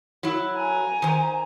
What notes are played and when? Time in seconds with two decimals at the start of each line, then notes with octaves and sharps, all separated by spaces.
0.23 F#3 E4
0.56 G#5 A#5
1.02 D#3 C5